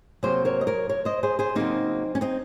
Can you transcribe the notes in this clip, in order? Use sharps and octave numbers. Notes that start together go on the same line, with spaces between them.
C3 F#3 A#3 G#4 C5
A#4 C#5
D#5
A#4 C#5
A#4 C#5
C5 D#5
G#4 C5
G#4 C5
C#3 F#3 A#3 C4 D#4
C#4
C4 D#4